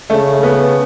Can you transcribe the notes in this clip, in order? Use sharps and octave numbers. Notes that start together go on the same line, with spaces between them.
C#3 A3
B3